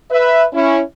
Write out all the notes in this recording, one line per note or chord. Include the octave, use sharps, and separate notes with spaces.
B4 E5
C#4 E4